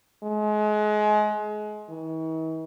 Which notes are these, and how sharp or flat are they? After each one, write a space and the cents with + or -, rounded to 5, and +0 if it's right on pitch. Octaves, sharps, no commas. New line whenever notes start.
G#3 +30
E3 -45